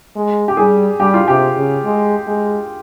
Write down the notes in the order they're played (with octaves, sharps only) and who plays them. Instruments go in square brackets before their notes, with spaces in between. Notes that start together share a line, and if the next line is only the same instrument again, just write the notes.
[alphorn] G#3
[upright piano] G4
[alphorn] G3 [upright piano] G#4
[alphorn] G3 [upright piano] G4
[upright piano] F4
[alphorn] C3 [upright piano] G4
[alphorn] C#3
G#3
G#3